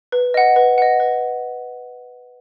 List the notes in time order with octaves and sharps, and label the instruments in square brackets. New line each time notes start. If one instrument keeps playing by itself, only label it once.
[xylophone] B4
D#5 F#5
B4
D#5 F#5
B4